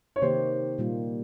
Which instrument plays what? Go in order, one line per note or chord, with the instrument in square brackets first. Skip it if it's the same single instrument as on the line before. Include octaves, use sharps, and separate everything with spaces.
[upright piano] C#5
[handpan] C3 D#3 A#3 D#4 G4 [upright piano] C5
[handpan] A#2 G3 A#3 F4